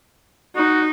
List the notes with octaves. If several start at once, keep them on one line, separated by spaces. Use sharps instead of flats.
D#4 F#4